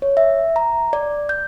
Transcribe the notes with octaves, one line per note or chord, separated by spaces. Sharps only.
C#5
E5
A#5
D5
G6